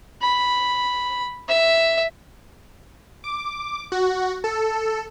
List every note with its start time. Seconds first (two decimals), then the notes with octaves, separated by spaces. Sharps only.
0.22 B5
1.49 E5
3.24 D6
3.92 F#4
4.44 A4